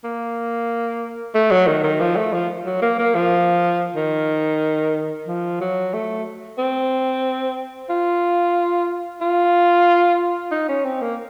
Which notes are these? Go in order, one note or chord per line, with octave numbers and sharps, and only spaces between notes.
A#3
A3
F#3
D#3
D#3
F3
A3
F3
F#3
A#3
A#3
F3
D#3
F3
F#3
A3
C4
F4
F4
D#4
C#4
C4
A#3